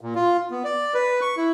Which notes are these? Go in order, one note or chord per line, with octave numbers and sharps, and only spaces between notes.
A#2
F4
B3
D5
B4
C#6
E4